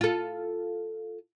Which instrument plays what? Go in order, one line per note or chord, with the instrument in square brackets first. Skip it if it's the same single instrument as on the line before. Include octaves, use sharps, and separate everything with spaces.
[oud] F4 A4